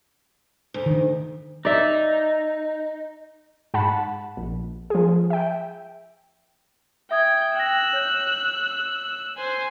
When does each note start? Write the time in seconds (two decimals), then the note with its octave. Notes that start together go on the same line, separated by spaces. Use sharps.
0.74 D2
0.86 D#3
1.65 D#4 D5 E5
3.74 G#2 F#5 A5 B5
4.37 A#1
4.90 F3 G#4
5.30 E5 G5
7.11 E5 G5 D#6 G#6
7.56 G5 E6 F#6 A#6
7.93 C#5 G6
9.36 C5 G#5